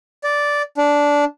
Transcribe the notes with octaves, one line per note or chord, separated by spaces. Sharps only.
D5
D4